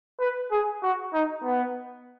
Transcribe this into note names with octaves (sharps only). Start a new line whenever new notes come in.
B4
G#4
F#4
D#4
B3